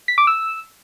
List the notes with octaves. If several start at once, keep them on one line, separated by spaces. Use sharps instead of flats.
B6
D6
E6